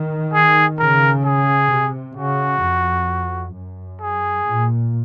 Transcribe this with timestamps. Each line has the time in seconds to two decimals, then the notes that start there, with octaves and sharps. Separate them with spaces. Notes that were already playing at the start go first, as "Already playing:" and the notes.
Already playing: D#3
0.34 G#4
0.80 C#3 A#4
1.25 G#4
1.72 C3
2.17 C#3 F#4
2.63 F2
3.55 F#2
4.02 G#4
4.48 A#2